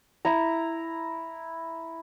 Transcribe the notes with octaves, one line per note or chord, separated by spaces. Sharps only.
E4 A#5